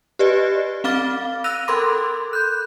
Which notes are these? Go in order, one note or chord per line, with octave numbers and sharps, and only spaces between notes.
G4 B4 D5 D#5
C4 F5 D6 F6 A6 G7
E6 F#6 A#6 D#7 F7
A4 A#4 B5 C6 D6
F#6 G6